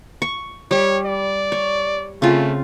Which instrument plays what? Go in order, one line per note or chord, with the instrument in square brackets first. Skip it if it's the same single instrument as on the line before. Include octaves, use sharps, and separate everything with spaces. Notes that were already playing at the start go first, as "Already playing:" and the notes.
[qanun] C#6
[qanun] G3 [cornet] C#5
[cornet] D5
[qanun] C#5
[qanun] C#3 C4 F4 [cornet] A3